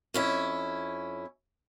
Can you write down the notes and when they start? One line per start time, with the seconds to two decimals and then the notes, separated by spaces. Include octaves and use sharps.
0.14 F2 C#4 E4